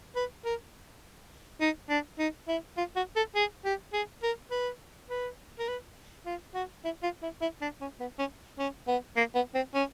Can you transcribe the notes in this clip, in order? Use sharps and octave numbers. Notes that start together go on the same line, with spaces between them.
B4
A#4
D#4
D4
D#4
E4
F4
F#4
A4
G#4
G4
G#4
A#4
B4
B4
A#4
B4
F4
F#4
E4
F4
E4
E4
D4
C#4
B3
C#4
C#4
B3
A#3
B3
C4
C#4